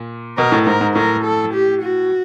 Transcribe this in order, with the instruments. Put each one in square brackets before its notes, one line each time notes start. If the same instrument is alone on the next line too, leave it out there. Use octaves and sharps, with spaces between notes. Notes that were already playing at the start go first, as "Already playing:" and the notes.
Already playing: [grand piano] A#2
[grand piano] B2 [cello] A#4
[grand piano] A2
[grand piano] G#2 [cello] A#4
[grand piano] G#2
[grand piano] A2 [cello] A#4
[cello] A4
G4
F#4